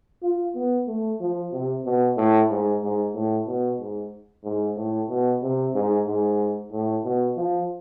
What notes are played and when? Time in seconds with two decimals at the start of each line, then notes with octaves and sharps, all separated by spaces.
0.22 F4
0.55 B3
0.88 A3
1.20 F3
1.52 C3
1.85 B2
2.17 A2
2.50 G#2
2.82 G#2
3.15 A2
3.47 B2
3.79 G#2
4.44 G#2
4.77 A2
5.09 B2
5.42 C3
5.75 G#2
6.06 G#2
6.71 A2
7.04 B2
7.36 F3